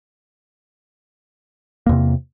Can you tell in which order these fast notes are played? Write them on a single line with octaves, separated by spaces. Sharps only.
A#3 E2 C3